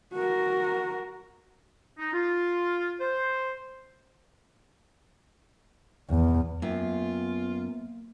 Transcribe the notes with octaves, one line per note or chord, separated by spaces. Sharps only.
F#4 A#4
D#4
F4
C5
E2
F#2 A#3 B3 F4 G5